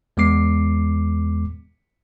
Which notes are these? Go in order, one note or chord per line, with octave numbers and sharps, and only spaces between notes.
E2 G#3 B3 D6 C7